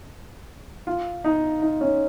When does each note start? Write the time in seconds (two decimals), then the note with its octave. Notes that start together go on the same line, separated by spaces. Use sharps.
0.87 F4
1.24 D#4
1.62 D#4
1.81 C#4